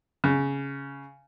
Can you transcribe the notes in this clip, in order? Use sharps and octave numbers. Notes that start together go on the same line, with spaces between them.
C#3